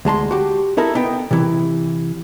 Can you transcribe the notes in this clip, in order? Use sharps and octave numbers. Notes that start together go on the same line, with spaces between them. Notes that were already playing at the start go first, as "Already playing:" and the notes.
D2 G#3 A5 C6
F#4 G4
D#4 E4 A4 A#4
B3 D#4 G5
C3 E3